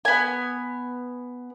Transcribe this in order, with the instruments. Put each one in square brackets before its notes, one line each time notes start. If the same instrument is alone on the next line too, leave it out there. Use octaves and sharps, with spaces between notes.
[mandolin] B3 G#5